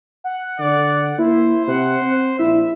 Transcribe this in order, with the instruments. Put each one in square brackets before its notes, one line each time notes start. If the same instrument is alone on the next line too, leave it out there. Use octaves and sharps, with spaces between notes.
[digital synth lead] F#5
[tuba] D3 [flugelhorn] D5
[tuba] A#3 [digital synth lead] E4 [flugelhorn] C5
[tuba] C3 [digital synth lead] F#5
[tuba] C4
[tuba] A#1 [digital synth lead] E4 [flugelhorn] E5